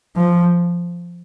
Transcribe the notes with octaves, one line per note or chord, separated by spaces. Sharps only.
F3